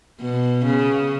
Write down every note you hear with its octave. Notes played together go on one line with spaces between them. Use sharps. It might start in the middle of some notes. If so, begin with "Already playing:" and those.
B2
C#3